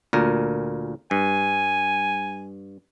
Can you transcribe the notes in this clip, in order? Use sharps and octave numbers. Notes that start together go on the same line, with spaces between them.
D2 A#2 A#4
G2 G#5